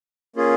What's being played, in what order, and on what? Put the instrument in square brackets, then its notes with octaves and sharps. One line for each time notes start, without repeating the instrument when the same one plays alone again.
[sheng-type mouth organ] A#3 C#4 F4 G#4